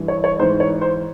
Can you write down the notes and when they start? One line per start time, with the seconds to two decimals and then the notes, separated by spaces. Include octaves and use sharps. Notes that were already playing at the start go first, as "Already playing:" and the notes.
Already playing: G2 E3
0.08 C#5
0.24 C#5
0.39 G#2 E3 C5
0.60 C#5
0.81 C5